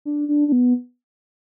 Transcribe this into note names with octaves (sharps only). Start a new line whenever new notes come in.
D4
D4
D4
B3